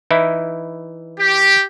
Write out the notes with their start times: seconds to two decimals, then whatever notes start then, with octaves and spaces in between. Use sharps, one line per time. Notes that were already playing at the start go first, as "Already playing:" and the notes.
0.11 E3 D#4 E4
1.19 G4